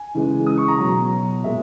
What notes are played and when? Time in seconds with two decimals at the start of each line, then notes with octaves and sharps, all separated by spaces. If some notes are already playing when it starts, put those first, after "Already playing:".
Already playing: G#5
0.15 C#3 E3 G#3
0.47 D#6
0.58 C#6
0.68 A#5
0.79 B2 F#3
1.44 A#2 G#3 E5